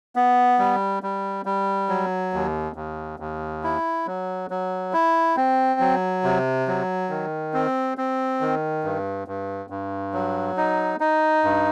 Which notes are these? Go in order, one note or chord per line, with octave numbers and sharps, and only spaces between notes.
B3
G3
G3
G3
F#3
D#2
D#2
D#2
E4
F#3
F#3
E4
C4
F#3
C3
F#3
D#3
C4
C4
D#3
G2
G2
G2
F#3
D#4
D#4
G2